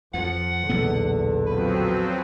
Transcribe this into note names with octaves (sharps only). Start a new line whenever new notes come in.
F2 F3 F#5
B1 E2 A#2 D3 B3
F3 F#3 C4 B4